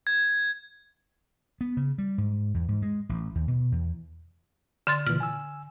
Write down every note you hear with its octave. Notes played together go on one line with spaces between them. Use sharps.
G#6
B3
C#3
G3
G#2
E2
G#2
G#3
A1
D#2
B2
E2
D3 C6 A6
A#2 C#3 E3 F6
G#5 E6